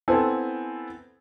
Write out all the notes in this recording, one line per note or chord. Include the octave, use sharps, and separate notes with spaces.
B3 C4 E4 A4 G#5